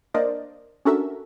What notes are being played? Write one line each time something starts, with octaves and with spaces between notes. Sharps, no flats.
A#3 D4 A#4 C5 D5 D#5
C#4 D4 F#4 A4 A#4 E5